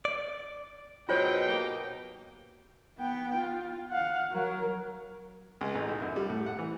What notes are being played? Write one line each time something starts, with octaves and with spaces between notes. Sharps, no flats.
D5
G#2 B2 F#3 D#4 F4 C5 C#5 G5
A#3 G4
B3 G5
F4
F5 F#5
F#3 A#4
C#2
A1
B1
F#2
G3
A2
F#5
E3